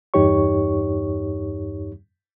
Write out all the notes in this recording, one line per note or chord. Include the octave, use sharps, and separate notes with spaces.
E2 G2 D#4 G4 C#5 C#6